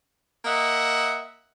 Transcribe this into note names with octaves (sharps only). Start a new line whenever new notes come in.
A#3 D#5 E5 F#5